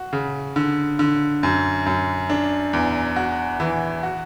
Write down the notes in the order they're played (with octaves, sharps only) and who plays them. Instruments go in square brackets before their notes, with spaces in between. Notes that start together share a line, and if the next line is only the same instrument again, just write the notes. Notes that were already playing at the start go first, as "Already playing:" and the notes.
Already playing: [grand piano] F#4
C#3
D3
D3
F#2
F#2
D4
E2
F#4
E3
F#4